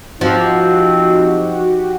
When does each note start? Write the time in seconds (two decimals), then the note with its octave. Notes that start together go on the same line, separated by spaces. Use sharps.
0.21 F3 C4 D#4 F#4 G4